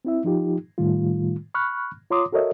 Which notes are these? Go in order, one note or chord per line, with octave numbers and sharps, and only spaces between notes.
C4 E4 E5
F3 D#4 F4 G4
A2 D#3 G3 A3 F4
B5 C#6 F6 F#6
F4 C#5 A#5 C6 D6 D#6
F#4 A4 A#4 C#5 D#5 E5